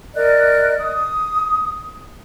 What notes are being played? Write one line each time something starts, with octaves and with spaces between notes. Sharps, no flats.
A#4 D5 D#5 F#6
D#6